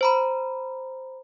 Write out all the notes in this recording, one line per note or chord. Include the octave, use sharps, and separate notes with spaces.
C5 A#5 B5